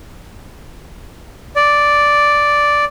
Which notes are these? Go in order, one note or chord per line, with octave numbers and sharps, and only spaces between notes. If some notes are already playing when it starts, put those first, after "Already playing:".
D5